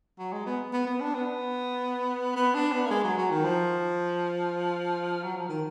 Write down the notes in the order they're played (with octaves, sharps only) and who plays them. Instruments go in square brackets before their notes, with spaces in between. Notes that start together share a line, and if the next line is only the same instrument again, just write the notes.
[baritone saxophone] F#3
G#3
B3
B3
B3
D4
B3
B3
D4
B3
A#3
G#3
F#3
F#3
D#3
F3
F#3
F3
D#3